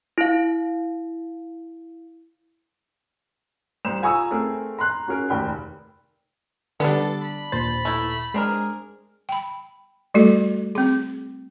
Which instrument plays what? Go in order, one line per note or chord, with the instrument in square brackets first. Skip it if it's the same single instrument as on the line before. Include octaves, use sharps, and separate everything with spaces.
[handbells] E4 F5
[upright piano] C2 C5 E7
F4 G#5 A#5 C#6 D#6 E6
A3 C4 G#4 A#4
A#5 C6 F#6
C#4 F#4 G#4 A#4
F1 D#2 A#4 G5 B5
[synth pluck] D3 G3 [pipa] B3 D4 [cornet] A4
[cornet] B5
[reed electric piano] D#2 A#2 A6 [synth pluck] C5
[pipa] A3 E4
[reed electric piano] G#3 [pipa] C4 D4 A#4 [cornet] G#4
[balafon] G5 B5
G3 A3 F#4 A4
C4 G#4